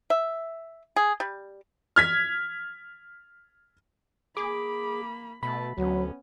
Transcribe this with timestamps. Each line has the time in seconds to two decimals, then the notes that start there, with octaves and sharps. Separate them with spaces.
0.10 E5
0.96 G#4
1.20 G3
1.96 F6 G#6 B6
4.37 A#3 G#4 B5 D6
5.43 B2 A3 A5 B5
5.78 D2 F#3 B3 C#4